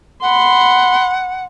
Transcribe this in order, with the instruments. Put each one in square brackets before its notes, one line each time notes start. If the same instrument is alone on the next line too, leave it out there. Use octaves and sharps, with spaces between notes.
[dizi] F#5 [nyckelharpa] B5 C6